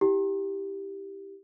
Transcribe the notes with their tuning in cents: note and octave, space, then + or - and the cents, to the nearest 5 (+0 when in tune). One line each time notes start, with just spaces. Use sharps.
E4 -25 G4 +0